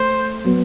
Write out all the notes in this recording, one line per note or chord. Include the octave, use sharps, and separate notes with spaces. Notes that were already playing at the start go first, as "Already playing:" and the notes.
Already playing: A3 C5
F#3 B3